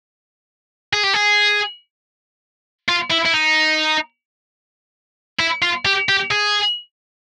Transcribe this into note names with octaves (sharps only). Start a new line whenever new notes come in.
G#4
G4
G#4
F4
E4
E4
D#4
E4
F4
G4
G4
G#4